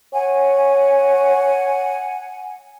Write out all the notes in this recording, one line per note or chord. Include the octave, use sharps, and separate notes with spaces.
C#5 F#5 G#5